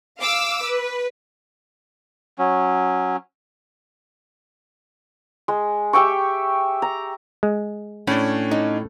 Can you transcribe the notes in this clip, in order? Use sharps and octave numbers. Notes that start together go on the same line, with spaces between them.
F5 D6 E6
B4
F#3 C#4
G#3
G4 E5 G5 C#6
A#5
G#3
A2 C#4 D4
D#4